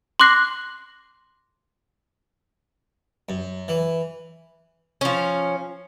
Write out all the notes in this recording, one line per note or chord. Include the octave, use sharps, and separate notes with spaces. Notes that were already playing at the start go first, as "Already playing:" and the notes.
C6 D6 F#6 A#6 C7
F#2
E3
F3 C#4